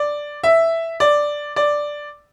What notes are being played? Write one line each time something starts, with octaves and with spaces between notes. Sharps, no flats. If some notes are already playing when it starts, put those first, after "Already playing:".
Already playing: D5
E5
D5
D5